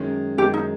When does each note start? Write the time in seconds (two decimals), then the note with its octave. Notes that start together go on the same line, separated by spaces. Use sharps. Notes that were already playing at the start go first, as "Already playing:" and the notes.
Already playing: F#2 D#3 G#3 C#4
0.37 F#2 D#3 G#3 C#4 G4
0.54 D#4